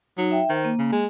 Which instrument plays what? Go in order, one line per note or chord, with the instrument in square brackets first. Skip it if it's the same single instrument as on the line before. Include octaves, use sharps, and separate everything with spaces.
[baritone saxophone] F#3 [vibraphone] D#4
[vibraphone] E5 G5
[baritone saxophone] D#3 [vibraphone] C5
[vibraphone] A#3
[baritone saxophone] C#3
G#3